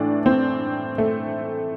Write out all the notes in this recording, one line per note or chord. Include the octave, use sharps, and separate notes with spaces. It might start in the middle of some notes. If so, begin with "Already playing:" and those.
Already playing: A2 E3 D4
C4
A3